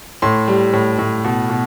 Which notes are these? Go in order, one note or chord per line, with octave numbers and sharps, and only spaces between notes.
A2 C6
G3
A2
A2
B2
B2